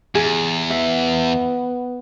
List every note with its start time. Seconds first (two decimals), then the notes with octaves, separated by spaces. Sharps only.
0.15 E2 G#4
0.70 B3 E5